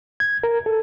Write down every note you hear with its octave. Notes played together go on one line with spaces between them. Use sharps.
G#6
A#4
A4